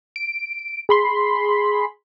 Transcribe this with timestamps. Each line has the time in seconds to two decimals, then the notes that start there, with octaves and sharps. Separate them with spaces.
0.16 D7
0.89 G#4 B5 C6